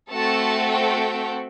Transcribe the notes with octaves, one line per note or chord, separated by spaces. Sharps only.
A3 C4 F#4 A4 A5
G5